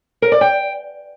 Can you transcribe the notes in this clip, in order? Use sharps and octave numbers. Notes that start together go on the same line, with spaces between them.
A#4
D5
G5